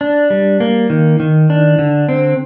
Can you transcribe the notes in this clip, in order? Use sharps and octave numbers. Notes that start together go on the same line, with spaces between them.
D4
G3
A#3
D#3
D#3
D4
D3
C4